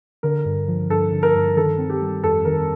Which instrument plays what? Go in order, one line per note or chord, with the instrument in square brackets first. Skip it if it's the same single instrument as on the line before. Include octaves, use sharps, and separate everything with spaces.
[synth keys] D3 [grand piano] A#4
[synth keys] G2
F3
[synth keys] G2 [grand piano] A4
[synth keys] D3
[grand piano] A#4
[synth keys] G2
[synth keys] D#3 [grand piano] A4
[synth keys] C4
[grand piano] G4
[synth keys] G3
[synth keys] F2 [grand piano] A4
[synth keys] D#3 [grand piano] A#4